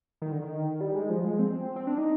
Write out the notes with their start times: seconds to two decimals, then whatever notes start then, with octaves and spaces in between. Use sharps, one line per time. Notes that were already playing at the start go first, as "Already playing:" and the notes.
0.22 D#3
0.32 D3
0.42 D#3
0.81 G3
0.95 G#3
1.09 F3
1.24 G#3
1.39 C4
1.76 C4
1.87 D4
1.98 D#4